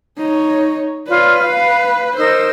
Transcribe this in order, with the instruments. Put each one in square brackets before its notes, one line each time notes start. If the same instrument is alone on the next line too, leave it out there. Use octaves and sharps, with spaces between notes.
[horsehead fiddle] D#4 C#5
[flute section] F4 C#5 D5 [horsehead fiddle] B4
[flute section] F5
[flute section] D#4 A#4 E6 [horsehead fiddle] C5